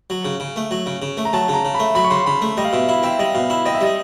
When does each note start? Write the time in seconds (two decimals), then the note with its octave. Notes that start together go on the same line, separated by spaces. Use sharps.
0.10 F#3
0.25 C#3
0.40 C#3
0.56 A3
0.71 F#3
0.86 C#3
1.02 C#3
1.17 A3
1.25 A#5
1.33 F#3 A5
1.48 C#3
1.54 A#5
1.65 C#3
1.74 A3 B5
1.95 F#3 B5
2.05 C#6
2.11 C#3 C6
2.26 C#3 B5
2.42 A3
2.57 G3 D#5
2.65 F5
2.73 B2 E5
2.88 E4 F5
3.03 C4 E5
3.19 G3 D#5
3.34 B2 F5
3.50 E4 E5
3.65 C4 D#5
3.75 E5
3.81 G3 D#5